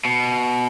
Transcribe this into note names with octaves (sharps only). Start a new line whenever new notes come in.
B2